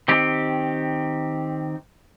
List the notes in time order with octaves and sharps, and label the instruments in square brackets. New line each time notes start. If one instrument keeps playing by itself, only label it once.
[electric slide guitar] D#3 C4 G4